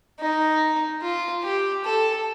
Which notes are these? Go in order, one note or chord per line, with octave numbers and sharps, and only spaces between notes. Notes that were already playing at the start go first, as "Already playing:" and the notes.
D#4
F4
G4
A4